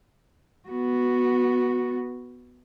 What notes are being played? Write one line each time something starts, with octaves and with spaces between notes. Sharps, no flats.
B3 F#4